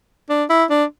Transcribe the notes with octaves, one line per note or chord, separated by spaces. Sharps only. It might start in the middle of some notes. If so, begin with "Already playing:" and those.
D4
E4
D4